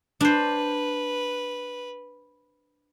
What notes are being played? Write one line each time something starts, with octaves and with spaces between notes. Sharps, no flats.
D4 B4 C5